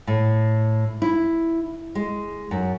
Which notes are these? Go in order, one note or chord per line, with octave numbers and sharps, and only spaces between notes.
A2
E4
G#3
F#2